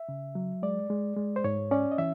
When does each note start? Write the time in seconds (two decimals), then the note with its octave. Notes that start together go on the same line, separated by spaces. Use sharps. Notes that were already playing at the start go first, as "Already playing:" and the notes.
Already playing: E5
0.09 C#3
0.35 F#3
0.63 G#3 D5
0.90 G#3
1.17 G#3
1.36 C5
1.44 G#2 C#5
1.71 C#4 D5
1.92 D#5
1.98 E3 E5